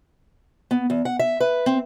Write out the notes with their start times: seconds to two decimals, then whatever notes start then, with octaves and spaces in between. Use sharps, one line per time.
0.71 B3
0.90 E2
1.05 F#5
1.19 E5
1.40 B4
1.66 C4